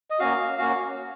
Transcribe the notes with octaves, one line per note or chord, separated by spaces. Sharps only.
D#5
A#3 C#4 F#4 F5
A#3 C#4 F#4 F5